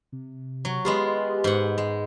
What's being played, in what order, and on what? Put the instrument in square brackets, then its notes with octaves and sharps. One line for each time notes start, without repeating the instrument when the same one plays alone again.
[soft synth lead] C3
[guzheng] F#3
[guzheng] G#3 B3 F4 [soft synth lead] G4
[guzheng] G#2 F#5
G#3